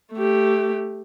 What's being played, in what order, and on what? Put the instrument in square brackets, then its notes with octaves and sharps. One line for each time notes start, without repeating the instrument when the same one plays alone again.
[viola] A3 G4